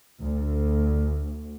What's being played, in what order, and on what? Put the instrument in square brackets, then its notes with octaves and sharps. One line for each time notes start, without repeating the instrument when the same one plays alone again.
[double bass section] D2